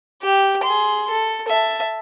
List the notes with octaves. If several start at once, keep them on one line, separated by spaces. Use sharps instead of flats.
G4
G#4 C6
A4
E5 A5